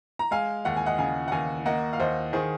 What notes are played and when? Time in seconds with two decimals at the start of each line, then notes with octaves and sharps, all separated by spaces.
0.19 A#5
0.31 G#3 F5 G#5
0.65 D#2 F#5
0.76 G#5
0.86 D#5 F#5
0.98 C#3 F5 G#5
1.28 F#5
1.32 D#2 F5 G#5
1.66 A#3 D#5 F#5
1.93 F5
2.00 D#2 C5 D#5
2.33 D#3 G#4 C5